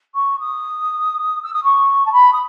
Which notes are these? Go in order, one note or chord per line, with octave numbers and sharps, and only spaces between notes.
C#6
D#6
E6
D#6
C#6
A5
B5
D#6